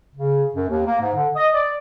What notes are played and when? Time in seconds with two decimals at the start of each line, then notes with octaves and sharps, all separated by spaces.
0.15 C#3
0.55 F#2
0.69 D#2
0.87 A#3
1.00 G#2
1.15 D3
1.36 D#5
1.53 D5